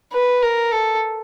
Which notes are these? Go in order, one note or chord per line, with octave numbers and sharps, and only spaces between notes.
B4
A#4
A4